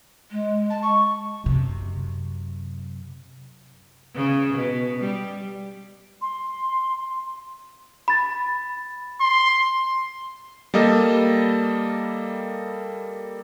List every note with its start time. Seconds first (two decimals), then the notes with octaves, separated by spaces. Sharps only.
0.31 G#3
0.70 A5
0.82 C#6
1.44 F#2 C3
4.15 C#3
4.53 B2
4.99 G3
6.22 C6
8.08 B5 A6
9.21 C6
10.74 G3 A#3 A4 D#5